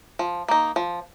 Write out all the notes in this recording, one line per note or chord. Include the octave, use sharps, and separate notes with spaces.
F3
A#3 D#4
F3